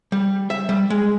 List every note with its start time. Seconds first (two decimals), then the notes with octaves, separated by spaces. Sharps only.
0.12 G3
0.50 E5
0.69 G3
0.90 G#3